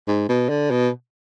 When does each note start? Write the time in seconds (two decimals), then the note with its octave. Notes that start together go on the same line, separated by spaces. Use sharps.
0.08 G#2
0.29 B2
0.49 D3
0.71 B2